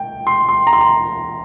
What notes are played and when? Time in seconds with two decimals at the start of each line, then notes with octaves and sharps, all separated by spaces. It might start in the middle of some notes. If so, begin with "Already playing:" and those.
Already playing: G5
0.27 C6
0.49 C6
0.67 A#5
0.73 C6
0.81 A#5